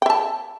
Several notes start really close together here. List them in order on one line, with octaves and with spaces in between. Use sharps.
G5 E5 A5